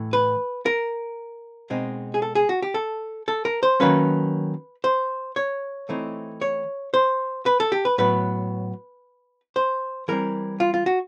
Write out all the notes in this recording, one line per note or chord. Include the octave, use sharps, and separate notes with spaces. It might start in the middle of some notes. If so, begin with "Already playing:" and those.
Already playing: A2 E3 A3
B4
A#4
B2 G#3 C4 D#4
G#4
A4
G#4
F#4
G4
A4
A4
A#4
C5
D#3 F#3 A#3 C#4 B4
C5
C#5
E3 A3 C4 D#4
C#5
C5
B4
A4
G4
B4
A2 F#3 B3 B4
C5
E3 G3 C4 A#4
F4
F4
F#4